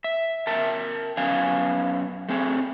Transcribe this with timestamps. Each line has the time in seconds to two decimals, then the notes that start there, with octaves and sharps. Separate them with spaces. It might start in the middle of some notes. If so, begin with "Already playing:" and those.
0.04 E5
0.47 A#4 E5 G5 A5
1.17 F#2 B3 C#4 F5 G#5
2.29 A3 C4 G#4